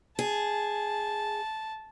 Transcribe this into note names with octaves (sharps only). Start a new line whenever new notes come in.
G#4 A5